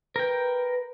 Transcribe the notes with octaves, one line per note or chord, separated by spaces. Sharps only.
A#4 B4 G5